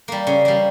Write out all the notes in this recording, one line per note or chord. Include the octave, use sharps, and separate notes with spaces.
G3 A#3
C#3
G3 A#3